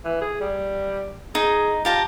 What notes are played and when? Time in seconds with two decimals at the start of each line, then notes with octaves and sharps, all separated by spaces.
0.05 E3
0.21 G#4
0.41 G3
1.35 D#4 G#4
1.85 F4 G4 A5 A#5